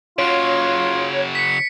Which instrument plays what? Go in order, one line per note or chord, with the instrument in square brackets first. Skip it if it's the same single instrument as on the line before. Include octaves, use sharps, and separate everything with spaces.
[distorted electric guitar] C#3 F#3 [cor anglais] F4 [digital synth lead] C#5 [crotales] D7
[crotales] B6 C#7